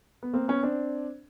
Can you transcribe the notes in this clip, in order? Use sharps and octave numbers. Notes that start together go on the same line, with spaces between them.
B3
A#3 C4
B3 C#4
C4 D4